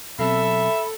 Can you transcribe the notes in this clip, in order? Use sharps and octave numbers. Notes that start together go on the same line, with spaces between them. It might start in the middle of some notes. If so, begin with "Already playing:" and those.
B2 F#3 C4 A4 E5 B5